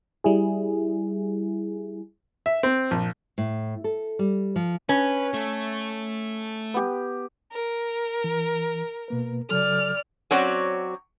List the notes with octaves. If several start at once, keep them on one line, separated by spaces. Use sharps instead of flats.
G3 E4 G#4
E5
C4
A#1
A2
A4
G3
F3
C#4 B4
A3
B3 G4
A#4
E3
B2 A#3 B4
C#3 F#3 A4 D5 F6
F#3 C4 C#4 F#4 C#5 D5